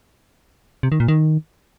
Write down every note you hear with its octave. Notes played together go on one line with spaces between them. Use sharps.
C3
D#3
A#2
D#3